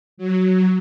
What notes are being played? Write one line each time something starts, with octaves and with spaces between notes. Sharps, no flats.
F#3